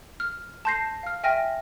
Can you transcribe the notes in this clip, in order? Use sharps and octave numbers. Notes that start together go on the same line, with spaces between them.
F6
A5 C6 G6 A#6 C7
F5 F6
E5 G5 G#5 F6 A#6